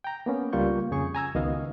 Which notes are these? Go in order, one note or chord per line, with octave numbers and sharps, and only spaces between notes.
G5 A#5
A#3 B3 C#4
C#2 G3 A#3 F4 C#6 G6
F2 C#3 G#4 C#6
G#5 A#5 E6 G#6
C#2 D#3 B3 F#4 D#5 F5